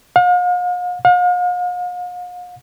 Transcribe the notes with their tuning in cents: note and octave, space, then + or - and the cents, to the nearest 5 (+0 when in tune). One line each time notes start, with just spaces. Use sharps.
F5 +45
F5 +45